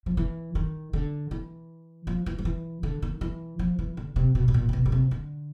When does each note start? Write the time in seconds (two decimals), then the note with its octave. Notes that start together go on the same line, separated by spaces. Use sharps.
0.06 F3
0.17 E3
0.55 D#3
0.93 D3
1.31 E3
2.07 F3
2.26 E3
2.39 F3
2.45 E3
2.83 D3
3.02 D#3
3.21 E3
3.59 F3
3.79 E3
3.97 D3
4.16 C3
4.35 B2
4.48 B2
4.54 A#2
4.69 C3
4.73 B2
4.86 B2
4.92 C3
5.11 D3